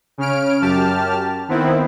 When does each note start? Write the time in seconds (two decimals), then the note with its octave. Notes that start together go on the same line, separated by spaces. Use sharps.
0.18 C#3 C#4 F6 D7
0.61 F#2 G4 A5 F6
1.48 D#3 B3 C4 E4